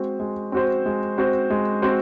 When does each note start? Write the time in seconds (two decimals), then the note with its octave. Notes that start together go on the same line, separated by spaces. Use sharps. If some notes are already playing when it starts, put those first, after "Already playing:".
Already playing: G#3 C4 F#4 C5
0.20 G#3
0.52 C4 F#4 C5
0.86 G#3
1.18 C4 F#4 C5
1.50 G#3
1.82 C4 F#4 C5